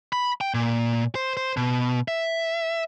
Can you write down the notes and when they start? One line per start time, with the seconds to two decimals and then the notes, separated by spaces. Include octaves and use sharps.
0.13 B5
0.41 G5
0.54 A#2
1.15 C5
1.37 C5
1.57 B2
2.08 E5